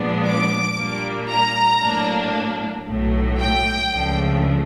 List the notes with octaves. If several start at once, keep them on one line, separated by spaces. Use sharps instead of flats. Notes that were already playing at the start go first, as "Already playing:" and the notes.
Already playing: A#2 F3 G#3 B3 D4
D6
A#2 G3 A#3 D4
A#5
A2 F#3 A#3 D4
B1 A2 F#3 A3
G5
C#2 C#3 F3 A3 D4